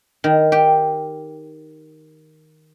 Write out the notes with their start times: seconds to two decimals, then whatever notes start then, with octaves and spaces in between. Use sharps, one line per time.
0.24 D#3
0.52 G4